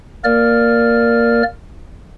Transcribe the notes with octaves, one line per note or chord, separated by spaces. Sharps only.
A#3 A#4 D5 F6